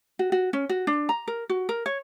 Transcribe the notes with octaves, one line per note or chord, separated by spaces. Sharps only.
F#4
F#4
C#4
F#4
D4
A#5
A#4
F#4
A#4
C#5